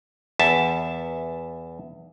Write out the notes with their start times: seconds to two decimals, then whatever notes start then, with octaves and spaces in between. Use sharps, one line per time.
0.39 E2 E5 A5